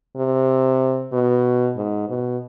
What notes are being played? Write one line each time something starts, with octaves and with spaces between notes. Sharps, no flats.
C3
B2
G#2
B2